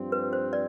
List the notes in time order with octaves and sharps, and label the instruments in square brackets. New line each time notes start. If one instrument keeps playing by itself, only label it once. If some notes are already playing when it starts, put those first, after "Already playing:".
Already playing: [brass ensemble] G2 F3 C4
[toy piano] B4
C5
D5